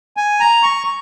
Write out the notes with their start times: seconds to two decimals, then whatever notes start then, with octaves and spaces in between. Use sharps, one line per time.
0.17 G#5
0.40 A#5
0.63 C#6